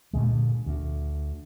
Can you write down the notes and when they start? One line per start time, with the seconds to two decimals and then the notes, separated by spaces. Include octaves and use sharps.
0.13 G2 A#2 D3 G#3
0.66 D2